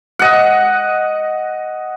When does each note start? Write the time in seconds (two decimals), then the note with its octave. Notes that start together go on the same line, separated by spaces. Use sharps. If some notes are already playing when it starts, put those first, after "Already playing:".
0.19 D#5 F#5